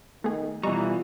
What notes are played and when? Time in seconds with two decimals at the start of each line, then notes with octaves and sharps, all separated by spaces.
0.24 D#3 A3 B3 G#4
0.63 B2 E3 G3 F4 D#5 A#5 C#6